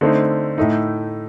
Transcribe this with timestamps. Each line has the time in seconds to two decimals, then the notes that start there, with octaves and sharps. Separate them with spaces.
0.01 D3 A3 C4 D#4
0.58 A2 A3 D#4